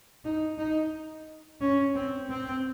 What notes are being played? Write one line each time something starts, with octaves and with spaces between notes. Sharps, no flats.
D#4
D#4
C#4
C4
C4